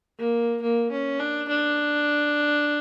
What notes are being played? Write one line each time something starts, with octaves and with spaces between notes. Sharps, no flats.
A#3
A#3
C#4
D4
D4